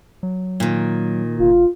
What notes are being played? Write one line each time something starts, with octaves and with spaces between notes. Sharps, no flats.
F#3
A#2 D#3
F1 F4